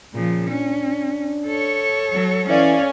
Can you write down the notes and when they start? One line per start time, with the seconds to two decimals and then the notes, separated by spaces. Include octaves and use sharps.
0.14 A#2 C#3 F3
0.50 C#4 D4
1.46 A4 C#5
2.15 F#3
2.49 E3 C#4 D5 F5